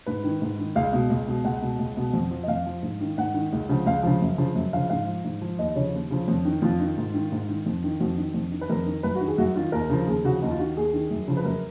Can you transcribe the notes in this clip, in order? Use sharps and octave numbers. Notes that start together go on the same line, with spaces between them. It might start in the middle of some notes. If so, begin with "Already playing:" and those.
G#2 B4
D#3
G#2
D#3
C#2 F5
B2
C#2
B2
C#2 F#5
B2
C#2
B2
F2
F3
D#5
F2 F5
F3
G#2
D#3
G#2 F#5
D#3
C#2
C#3 F3
C#2 F5
C#3 F3
F#2
C#3 F3
F#2
C#3 F3 F5
G#2 F5
F3
G#2
F3
D#2 D#5
C#3 F3 C#5
D#2
C#3 F3
F2
D#3
F2 F4
D#3
G#2
D#3
G#2
D#3
F2
D#3
F2 F#4
D#3
F2
D#3
B4
F2 A#4
D#3
F#2 B4
F#4
D#3
G#4
F#2 F#4
D#3 F4
D#2 A#4
C#3 F3
D#2 G#4
C#3 F3 F#4
D#2 D#4
F4
D#3 F#4
D#2 G#4
D#3
F#2
C#3 F3
B4
F#2 A#4